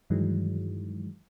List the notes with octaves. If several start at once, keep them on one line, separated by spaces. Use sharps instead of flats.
G2 D#3 E3 F#3 G#3